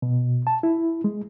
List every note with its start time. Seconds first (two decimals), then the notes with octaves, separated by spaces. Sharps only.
0.02 B2
0.47 A5
0.63 E4
1.04 G#3